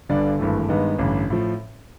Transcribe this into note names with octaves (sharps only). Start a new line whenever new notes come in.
G1 G2 D3 D5
G#1 G2 E3 A3
G2 D#3 G#3 B3
A1 G2 D3
A2 F3